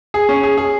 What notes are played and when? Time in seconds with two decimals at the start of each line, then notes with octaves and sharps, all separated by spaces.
0.14 G#4
0.29 C#4
0.43 G#4
0.57 G#4